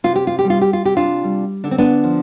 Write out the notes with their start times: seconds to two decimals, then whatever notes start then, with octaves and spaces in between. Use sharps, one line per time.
0.04 C3 F4
0.16 G4
0.27 F4
0.39 G4
0.45 G3
0.50 F4
0.61 G4
0.73 F4
0.84 C3 G4
0.97 D4 F4
1.24 G3
1.64 D3 D4
1.71 C4
1.78 B3 D4
2.04 F3